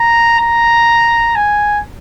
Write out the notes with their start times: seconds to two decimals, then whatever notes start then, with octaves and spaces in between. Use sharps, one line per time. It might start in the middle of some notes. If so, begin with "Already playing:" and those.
Already playing: A#5
0.39 A#5
1.35 G#5